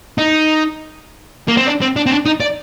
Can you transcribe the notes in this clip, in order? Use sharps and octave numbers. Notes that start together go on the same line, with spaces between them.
D#4
A#3
C4
D4
C4
D4
C4
D4
D#4
D5